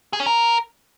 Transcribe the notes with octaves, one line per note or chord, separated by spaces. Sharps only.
G#4
C#4
A#4